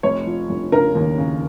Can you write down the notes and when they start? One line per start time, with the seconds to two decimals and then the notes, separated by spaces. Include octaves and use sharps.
0.03 F1 C#5
0.26 F3
0.49 F1
0.72 C#3 A#4
0.95 D#2
1.18 C#3